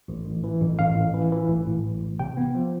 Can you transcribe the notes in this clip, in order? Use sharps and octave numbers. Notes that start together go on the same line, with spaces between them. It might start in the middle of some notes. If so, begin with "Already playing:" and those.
A1
A1
E3
A1
A1 F5
A1
E3
E3
A1
A2
A1
A1
C3 G5
B3
F3